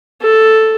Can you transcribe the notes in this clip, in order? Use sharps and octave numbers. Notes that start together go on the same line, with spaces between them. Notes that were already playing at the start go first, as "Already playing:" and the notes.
A4